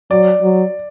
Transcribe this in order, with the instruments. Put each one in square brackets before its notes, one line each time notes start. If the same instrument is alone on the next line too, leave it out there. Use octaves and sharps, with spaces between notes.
[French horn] F#3 [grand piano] D5
[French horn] F#3